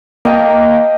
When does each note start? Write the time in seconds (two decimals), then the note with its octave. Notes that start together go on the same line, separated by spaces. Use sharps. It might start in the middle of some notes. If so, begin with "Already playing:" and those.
0.25 A#3 D#5 G5 A5